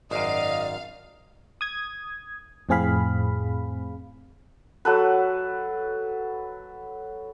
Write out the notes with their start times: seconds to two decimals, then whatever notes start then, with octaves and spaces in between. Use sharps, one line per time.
0.11 G#1 F#2 D5 D#5 F5
1.61 D#6 G#6
2.69 F2 A2 C4 G#4 F5 B5
4.85 F#3 A4 B4